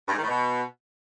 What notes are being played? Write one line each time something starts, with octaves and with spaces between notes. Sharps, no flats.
G2
G#2
D#3
A2
B2